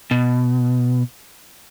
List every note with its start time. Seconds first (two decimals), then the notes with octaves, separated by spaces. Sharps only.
0.11 B2